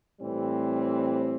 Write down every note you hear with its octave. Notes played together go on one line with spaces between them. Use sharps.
A2 E3 G3 C4